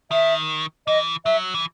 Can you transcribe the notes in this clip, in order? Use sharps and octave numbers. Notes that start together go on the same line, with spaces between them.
D#3 E5
E3 D#5
F#3 E5
E3